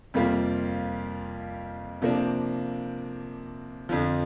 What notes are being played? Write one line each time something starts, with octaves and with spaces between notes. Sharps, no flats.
F2 C3 G3 A#3 F4
C3 F3 A#3 D4
F2 D3 F3